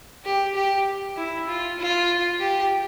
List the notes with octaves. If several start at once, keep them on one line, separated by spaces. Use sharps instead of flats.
G4
G4
E4
F4
F4
G4